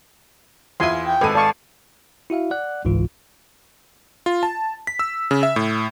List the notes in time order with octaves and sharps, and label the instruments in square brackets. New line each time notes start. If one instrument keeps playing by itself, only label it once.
[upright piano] E2 E4 [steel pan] F4 G#5 C6
[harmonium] G5
[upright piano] G#1 G#3 D#7 [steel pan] A4 B4
[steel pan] D5 F5 C#6 [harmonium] A5
[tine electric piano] E4 F#4 E5 F5
D5 F#5 F#6
G1 C#2 G#2 E3 F4
[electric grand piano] F4
A5
B6
E6
C#3
E5
A2